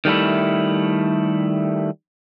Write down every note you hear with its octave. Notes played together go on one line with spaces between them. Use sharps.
D#3 G3 A3 E4